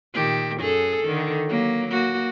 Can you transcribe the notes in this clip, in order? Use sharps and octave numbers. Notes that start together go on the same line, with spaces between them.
A#2 D#3 G4
F#2 G#4 A4
D3 D#3
F#3 A#3
A#3 F#4